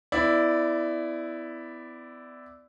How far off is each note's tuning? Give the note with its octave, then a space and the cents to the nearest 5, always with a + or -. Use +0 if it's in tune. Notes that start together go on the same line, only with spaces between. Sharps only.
B3 +35 E4 +0 D5 +0